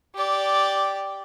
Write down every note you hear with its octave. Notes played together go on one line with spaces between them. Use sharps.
G4 D5